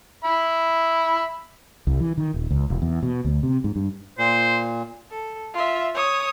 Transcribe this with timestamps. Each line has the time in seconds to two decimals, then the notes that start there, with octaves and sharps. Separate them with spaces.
0.25 E5 B5
1.87 C2
2.00 E3
2.18 D#3
2.34 D#1
2.51 C#2
2.70 E1
2.82 E2
3.03 B2
3.25 D2
3.43 C3
3.64 G#2
3.76 G2
4.18 A#2 C5
5.11 A4
5.54 F4 E5
5.95 C#5 D#6